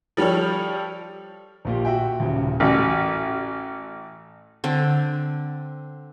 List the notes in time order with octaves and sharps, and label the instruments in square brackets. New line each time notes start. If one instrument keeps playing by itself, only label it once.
[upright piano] F3 G3 G4 A4 C#5
[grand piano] A#1 A#2 G4
F#4 E5 G5
D#1 C#2
[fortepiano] A1 [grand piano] A3 F#4
[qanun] D3 C4